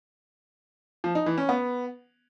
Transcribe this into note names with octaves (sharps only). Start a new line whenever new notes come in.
F3
D#4
E3
C#4
B3